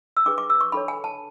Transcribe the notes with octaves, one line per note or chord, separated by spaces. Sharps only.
E6
D4 G#4 B4 D6
D6
E6
C#6
D4 A4 C#5 B5
G#5
A5